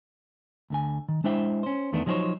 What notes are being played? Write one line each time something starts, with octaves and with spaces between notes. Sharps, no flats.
D2 D3 G#5
D#3
G#3 D4 E4 C5 E5 G5
C#4 C5
E2 D#3 A3 B3 D4
F3 F#3 D#4 G#4 C5 C#5